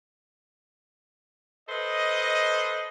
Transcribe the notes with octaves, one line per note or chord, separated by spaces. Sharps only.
A4 B4 C5 D#5